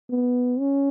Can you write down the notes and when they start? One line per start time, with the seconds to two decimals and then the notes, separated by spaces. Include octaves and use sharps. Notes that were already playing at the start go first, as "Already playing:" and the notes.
0.10 B3
0.60 C#4